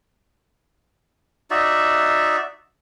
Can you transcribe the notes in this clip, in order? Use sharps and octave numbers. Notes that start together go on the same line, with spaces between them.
D#4 F#4 D5 E5